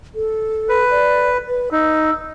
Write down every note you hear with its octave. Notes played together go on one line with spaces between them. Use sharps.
A4
B4
D5
B4
D#4 E6